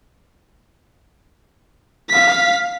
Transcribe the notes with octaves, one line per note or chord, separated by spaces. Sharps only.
F5 B6